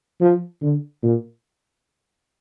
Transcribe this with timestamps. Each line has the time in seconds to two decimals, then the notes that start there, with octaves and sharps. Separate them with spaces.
0.20 F3
0.61 D3
1.02 A#2